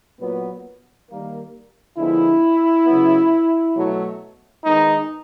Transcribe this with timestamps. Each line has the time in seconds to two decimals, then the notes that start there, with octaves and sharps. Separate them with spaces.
0.20 A#2 F#3 B3
1.09 D#3 G3 A#3
1.97 D3 F3 G#3 B3 E4
2.87 C#3 F#3 B3
3.75 B2 F#3 A3
4.65 D#3 G#3 B3 D#4